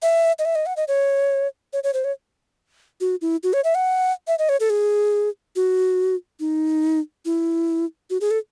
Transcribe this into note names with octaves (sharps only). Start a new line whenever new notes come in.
E5
D#5
E5
D#5
F#5
D#5
C#5
C#5
C#5
C5
C#5
F#4
E4
F#4
C#5
E5
F#5
E5
D#5
C#5
A4
G#4
F#4
D#4
E4
F#4
G#4
A4